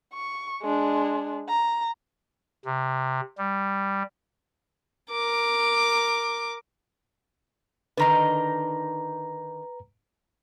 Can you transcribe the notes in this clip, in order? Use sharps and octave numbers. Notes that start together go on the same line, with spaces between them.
C#6
G#3 D4
A#5
C3
G3
A#4 D6
D3 D#3 D#4 B4 A#5